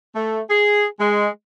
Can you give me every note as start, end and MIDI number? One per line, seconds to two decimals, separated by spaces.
0.15 0.40 57
0.49 0.85 68
1.00 1.27 56